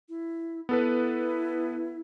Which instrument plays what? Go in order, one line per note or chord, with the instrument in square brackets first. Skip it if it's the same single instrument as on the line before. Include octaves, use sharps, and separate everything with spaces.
[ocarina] E4
[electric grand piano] B3 A4 B4 [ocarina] E4